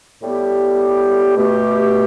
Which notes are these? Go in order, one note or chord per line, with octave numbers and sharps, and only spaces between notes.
A2 G3 B3 G4
B2 A3 G4